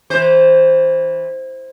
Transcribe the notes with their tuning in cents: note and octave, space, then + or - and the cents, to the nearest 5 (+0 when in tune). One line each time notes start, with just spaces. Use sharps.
E3 -15 C5 +0